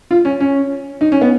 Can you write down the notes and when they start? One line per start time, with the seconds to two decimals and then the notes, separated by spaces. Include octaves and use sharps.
0.11 F4
0.25 C#4
0.40 C#4
1.01 D#4
1.12 C#4
1.21 B3